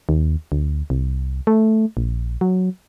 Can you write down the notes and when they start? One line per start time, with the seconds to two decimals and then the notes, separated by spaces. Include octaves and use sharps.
0.09 D#2
0.52 D2
0.90 C2
1.47 A3
1.97 A#1
2.41 F#3